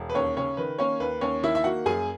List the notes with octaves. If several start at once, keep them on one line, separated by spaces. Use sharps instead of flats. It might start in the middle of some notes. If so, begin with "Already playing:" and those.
Already playing: E1
B4
D#2 C#4 C#5
C#3 C#4 C#5
D#3 B4
A#3 C#4 C#5
D#2 B4
D#2 C#4 C#5
D#3 E4 E5
E5
A#3 F#4 F#5
F#2 G#4 G#5